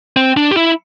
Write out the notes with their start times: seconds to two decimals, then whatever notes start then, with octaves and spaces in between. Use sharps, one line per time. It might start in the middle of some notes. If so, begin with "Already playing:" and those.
0.17 C4
0.37 D4
0.51 G4
0.57 E4